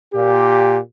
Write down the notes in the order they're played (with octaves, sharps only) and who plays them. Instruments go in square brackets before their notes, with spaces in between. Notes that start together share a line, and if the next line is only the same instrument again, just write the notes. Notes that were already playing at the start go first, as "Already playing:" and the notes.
[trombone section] A#2 G4